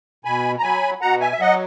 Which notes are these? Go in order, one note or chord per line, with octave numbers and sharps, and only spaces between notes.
B2 G#5 B5
A#5
F#3 G#5 B5
B2 F#5 A#5
E5 G#5
E5
F#3 D#5 F#5